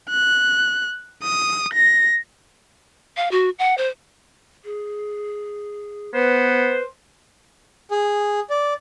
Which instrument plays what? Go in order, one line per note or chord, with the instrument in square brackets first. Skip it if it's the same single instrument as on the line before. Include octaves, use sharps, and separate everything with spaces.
[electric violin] F#6
D#6
A#6
[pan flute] F5
F#4
F#5
C5
G#4
[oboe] B3 [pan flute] B4 [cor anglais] C5
[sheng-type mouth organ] G#4
D5